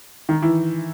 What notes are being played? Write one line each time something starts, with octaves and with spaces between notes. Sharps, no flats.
D#3
E3